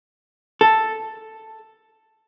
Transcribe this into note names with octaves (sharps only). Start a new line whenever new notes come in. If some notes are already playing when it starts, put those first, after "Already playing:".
A4